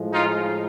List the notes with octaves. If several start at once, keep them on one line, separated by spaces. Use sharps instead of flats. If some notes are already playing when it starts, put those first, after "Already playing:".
Already playing: A2 F3 G#3
D#4 F4